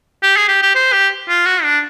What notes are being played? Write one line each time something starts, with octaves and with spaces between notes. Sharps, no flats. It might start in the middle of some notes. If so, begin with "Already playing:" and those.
G4
G#4
G4
G4
C5
G4
F4
F#4
D4